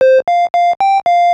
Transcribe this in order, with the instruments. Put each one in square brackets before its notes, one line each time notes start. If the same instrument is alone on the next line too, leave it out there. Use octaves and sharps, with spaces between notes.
[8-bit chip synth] C5
F5
F5
G5
F5